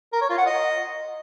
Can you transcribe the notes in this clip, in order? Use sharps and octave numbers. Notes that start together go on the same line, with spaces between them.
A#4
C#5
F4
F#5
D#5